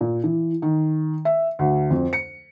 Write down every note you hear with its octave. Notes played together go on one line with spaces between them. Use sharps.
A#2
E3
D#3
E5
D2
F2
C#7